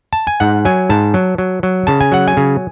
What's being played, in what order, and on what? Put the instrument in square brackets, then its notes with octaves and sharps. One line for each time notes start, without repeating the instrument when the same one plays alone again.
[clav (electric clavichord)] A5
G#5
G#2 F#5
F#3 G#5
G#2 A5
F#3
F#3
F#3
C#3 A5
G#5
F#3 F#5
G#5
C#3